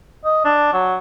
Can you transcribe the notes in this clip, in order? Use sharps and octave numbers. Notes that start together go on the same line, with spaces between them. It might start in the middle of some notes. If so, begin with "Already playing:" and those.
D#5
D4
F#3